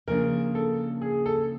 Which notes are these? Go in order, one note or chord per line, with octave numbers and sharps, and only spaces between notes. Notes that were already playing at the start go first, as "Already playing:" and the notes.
C#3 F3 A#3 D4 A#4
A4
G#4
A4